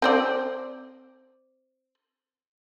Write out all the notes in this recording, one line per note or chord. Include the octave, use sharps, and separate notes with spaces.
C4 C5 D5